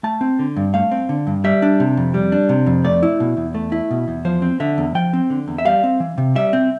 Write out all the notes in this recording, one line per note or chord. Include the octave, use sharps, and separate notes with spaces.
A3 A5
C4
D3
G2
A3 F5
C4
D3
G2
G3 E5
D4
C3
F2
G3
D4
C3
F2
A3 D5
E4
B2
E2
A3
E4
B2
E2
F3 C5
C4
D3 E5
E2
F3 G5
C4
D3
E2
E5
G3 F5
C4
E3
C3
G3 E5
C4